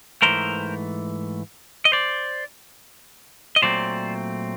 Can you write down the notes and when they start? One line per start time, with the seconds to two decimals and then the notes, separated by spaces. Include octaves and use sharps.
0.22 G#2 E3 A3 A#4 C5
1.85 D#5
1.92 C5 D5
3.56 D#5
3.62 A#2 F#3 A3 C4 C5 D5